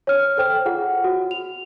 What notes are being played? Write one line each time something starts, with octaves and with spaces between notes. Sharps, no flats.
C#5 F6
A4 C5 G5 F6
F4 G#4 F#5
F#4
F7